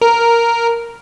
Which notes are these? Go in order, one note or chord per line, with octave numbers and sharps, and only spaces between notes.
A#4